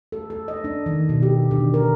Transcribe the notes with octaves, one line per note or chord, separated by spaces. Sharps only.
A4
A4
D#5
D4
D#3
B2
G4
D3
A#4